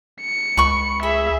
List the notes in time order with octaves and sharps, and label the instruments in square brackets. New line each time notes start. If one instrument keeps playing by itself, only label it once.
[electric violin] C#7
[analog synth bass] C#2 [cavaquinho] B5 C#6
[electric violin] G#4 E5 [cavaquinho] B5